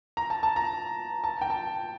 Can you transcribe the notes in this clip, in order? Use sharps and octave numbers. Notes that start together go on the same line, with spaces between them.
A#5
A5
A5
A#5
A5
G5
A5